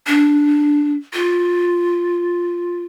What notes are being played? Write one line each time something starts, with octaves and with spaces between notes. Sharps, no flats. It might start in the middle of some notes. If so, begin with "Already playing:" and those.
D4
F4